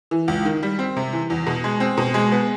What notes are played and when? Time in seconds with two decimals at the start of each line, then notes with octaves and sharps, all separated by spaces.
0.11 E3
0.28 C#2
0.45 D#3
0.63 G3
0.79 C4
0.97 C3
1.13 E3
1.30 E2
1.47 B2
1.64 G#3
1.80 C4
1.97 B2
2.14 G#3
2.32 B3